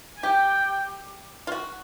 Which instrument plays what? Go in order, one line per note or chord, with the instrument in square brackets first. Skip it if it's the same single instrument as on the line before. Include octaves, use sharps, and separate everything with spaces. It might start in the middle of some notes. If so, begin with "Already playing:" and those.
[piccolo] G#5
[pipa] G4 [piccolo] G5
[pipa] F4
F#4